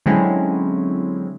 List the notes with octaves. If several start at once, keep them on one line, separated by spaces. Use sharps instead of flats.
D3 F#3 G#3 C4 C#4 E4